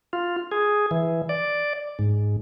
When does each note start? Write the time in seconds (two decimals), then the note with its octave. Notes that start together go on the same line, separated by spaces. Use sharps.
0.13 F4
0.52 G#4
0.91 E3
1.29 D5
1.99 G#2